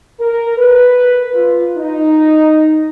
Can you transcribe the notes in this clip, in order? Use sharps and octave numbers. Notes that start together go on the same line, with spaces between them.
A#4
B4
F4
D#4